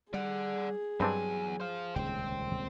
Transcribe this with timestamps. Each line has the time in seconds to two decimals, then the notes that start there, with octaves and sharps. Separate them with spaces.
0.14 G3 G#4 D5 F#5
1.00 E2 G2 F#3 C4 D4 G#5
1.60 C5 F5
1.96 D#1 C#2 C3 C5 G5